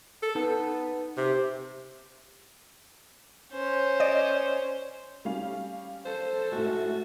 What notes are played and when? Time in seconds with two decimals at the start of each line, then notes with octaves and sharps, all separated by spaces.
0.22 A4
0.35 B3 D#4 A5
1.17 C3
3.53 C#4 C5
4.00 D5 D#5
5.25 G3 C#4 F5
6.05 A4 C5
6.52 A2 G#3 F#4